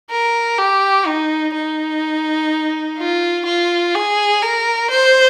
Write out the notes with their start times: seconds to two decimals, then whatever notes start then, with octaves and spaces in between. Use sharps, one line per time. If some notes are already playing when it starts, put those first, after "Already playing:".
0.11 A#4
0.58 G4
1.07 D#4
1.54 D#4
2.98 F4
3.46 F4
3.95 G#4
4.42 A#4
4.91 C5